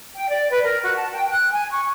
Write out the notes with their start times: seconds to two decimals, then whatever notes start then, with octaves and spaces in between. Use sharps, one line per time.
0.16 G5
0.30 D5
0.51 B4
0.63 A#4
0.83 F#4
0.95 A5
1.13 G5
1.30 F#6
1.52 G#5
1.72 C#6